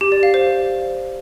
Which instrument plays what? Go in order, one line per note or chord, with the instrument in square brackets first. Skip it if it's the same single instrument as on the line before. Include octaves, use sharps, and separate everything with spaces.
[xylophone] G4
D5
F5
C5